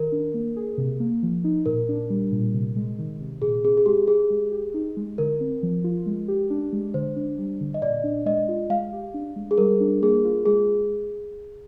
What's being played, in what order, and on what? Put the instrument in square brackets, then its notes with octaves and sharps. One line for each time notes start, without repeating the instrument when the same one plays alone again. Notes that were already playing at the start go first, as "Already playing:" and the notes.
Already playing: [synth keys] D#3 [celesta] A#4
[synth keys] D4
A#3
G#4
C3
A#3
F3
D#4
[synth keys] A#2 [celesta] A#4
[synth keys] D4
G3
A#2
C3
G#3
D#3
C3
[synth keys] A#2 [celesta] G#4
[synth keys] C4 [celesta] G#4
[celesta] G#4
[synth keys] G#3 [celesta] G4
[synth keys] G4 [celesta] G#4
[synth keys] G#3
G4
D#4
G#3
[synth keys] D3 [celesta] A#4
[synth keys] C4
F3
F4
G#3
G4
D4
G#3
[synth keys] D3 [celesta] C5
[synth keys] D4
G3
D3
[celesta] D#5
[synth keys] A#2 [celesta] D5
[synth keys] D4
[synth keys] G#3 [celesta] D#5
[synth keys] F4
[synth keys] G#3 [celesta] F5
[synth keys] G4
D4
G#3
[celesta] G#4
[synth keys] G3 [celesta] A#4
[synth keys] D4
[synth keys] A#3 [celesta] G#4
[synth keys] F4
[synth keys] G#3 [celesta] G#4